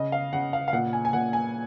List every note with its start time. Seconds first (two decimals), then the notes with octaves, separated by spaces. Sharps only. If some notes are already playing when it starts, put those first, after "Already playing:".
Already playing: C#3 D#5
0.12 F5
0.33 C#3 F#5
0.53 F5
0.68 F5
0.73 A#2 F#5
0.93 G#5
1.05 G#5
1.13 A#2 F#5
1.33 G#5